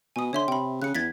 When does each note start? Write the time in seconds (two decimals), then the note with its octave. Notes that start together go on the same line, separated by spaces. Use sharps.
0.16 B2 G#5 D#6
0.33 D3 C#5 E5 C6
0.48 C3 G5 B5
0.82 C#3 F#6 C#7
0.95 E2 G#6 A6 B6